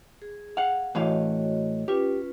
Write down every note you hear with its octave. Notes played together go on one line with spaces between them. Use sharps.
G#4
F5 F#5
A2 E3 F#4 C#5 D#5 F5
C#4 F4 G4 B4